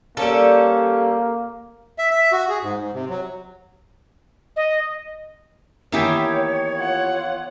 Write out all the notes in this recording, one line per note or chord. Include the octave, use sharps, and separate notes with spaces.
G3 A#3 C#4 A4
E5
E5
F#4
G#4
G#2
G#2
C3
F#3
D#5
D#3 E3 A#3 B3 E4 G4 C#5
F4 F#5